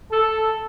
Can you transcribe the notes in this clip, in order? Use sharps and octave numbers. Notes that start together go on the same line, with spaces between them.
A4